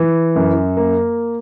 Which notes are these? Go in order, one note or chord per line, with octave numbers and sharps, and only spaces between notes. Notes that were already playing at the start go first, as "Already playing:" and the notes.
Already playing: E3
F#2
A#3